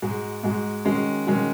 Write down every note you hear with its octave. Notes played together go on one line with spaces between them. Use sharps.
G#2 G#3 F#4
G#2 G#3 F#4
D#3 G#3 C#4 F#4
D#3 G#3 C#4 F#4